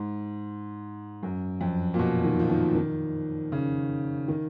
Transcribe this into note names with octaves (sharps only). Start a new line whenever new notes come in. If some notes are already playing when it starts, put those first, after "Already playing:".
Already playing: G#2
F#2
F2
A#2
B2
D#3
F3
D#3
D#3
C#3
D#3